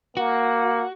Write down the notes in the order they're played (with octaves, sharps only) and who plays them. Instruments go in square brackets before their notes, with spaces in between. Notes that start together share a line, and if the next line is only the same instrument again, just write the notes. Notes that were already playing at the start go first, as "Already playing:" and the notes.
[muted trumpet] A#3 [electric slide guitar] F#4